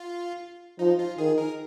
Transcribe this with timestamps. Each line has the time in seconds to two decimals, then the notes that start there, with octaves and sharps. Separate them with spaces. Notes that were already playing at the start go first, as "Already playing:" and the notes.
Already playing: F4
0.79 F3 D#4
0.99 F4
1.18 D#3 G#4
1.38 A#4